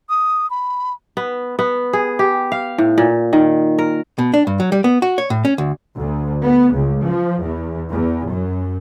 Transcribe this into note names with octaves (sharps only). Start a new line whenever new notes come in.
D#6
B5
B3
B3
G#4
G4
F5
A2
A#2
D#3
A#4
B2
D4
G2
F#3
G3
B3
F#4
C#5
A2
C#4
D2
D2
B3
C#2
F3
E2
E2
F#2